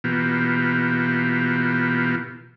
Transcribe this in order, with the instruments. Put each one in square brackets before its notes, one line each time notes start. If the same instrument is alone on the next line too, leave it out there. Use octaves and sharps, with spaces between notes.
[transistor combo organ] B2 E3 A#3 B3 F4 G4